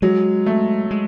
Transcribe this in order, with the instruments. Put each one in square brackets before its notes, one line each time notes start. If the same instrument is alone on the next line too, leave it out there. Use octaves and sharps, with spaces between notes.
[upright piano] F#3 [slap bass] G#3
[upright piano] A3
[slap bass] G#3